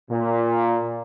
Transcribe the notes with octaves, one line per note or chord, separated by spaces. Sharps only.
A#2